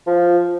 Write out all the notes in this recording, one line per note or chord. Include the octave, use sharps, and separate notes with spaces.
F3